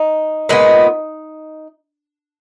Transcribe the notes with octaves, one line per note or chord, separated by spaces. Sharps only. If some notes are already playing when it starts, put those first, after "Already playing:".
Already playing: D#4
A#2 G#3 B3